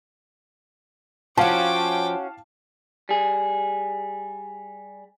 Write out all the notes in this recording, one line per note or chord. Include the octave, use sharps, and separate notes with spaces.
F3 C#4 F#4 F5 G5 A5 D6
G3 G#4